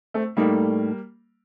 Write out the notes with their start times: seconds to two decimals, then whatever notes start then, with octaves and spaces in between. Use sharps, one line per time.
0.14 A3 C4
0.37 A2 G3 A3 A#3 D#4 A4 D5